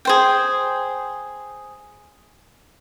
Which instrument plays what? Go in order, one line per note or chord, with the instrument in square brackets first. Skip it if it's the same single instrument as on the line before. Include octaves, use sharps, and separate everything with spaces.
[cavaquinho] G#4 C5 G5